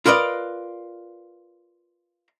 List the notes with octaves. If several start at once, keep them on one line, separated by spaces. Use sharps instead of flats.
F4 A#4 B4 D5 D#5